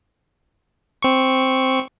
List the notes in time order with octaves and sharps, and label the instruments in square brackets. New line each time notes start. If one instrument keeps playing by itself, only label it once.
[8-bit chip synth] C4 C#6